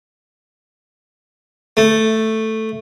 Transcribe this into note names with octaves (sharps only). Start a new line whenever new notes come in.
A3